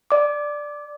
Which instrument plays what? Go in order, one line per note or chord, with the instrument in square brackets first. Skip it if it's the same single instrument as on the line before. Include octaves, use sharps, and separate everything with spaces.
[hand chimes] D5 D6